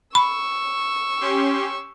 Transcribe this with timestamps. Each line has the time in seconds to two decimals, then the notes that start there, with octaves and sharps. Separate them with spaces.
0.15 B5 C#6 E6
1.21 C#4 G4 C6